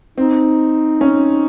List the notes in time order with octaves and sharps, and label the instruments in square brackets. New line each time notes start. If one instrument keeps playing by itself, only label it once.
[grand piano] C4 [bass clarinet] D#4
[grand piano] C#4